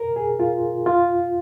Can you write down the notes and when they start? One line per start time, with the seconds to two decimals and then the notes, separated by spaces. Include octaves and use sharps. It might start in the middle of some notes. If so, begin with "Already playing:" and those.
Already playing: A#4
0.16 G#4
0.40 F4
0.86 F4